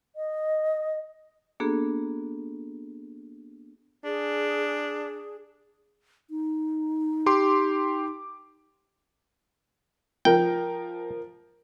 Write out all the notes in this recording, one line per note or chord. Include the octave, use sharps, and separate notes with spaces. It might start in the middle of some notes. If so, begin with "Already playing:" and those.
D#5
A#3 B3 D4 F#4 G#4 A4
D4 G#4
D#4
G4 C6 D6
F3 A#4 G5